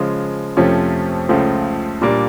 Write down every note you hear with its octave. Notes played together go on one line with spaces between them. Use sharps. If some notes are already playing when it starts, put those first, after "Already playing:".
Already playing: C#3 F3 G#3
F2 C3 F3 A3 C#4
C#2 C#3 F3 A3
A#2 G3 A#3 D4